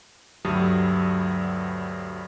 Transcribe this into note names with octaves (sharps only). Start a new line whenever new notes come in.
D2 G2 F#3 G3 D#6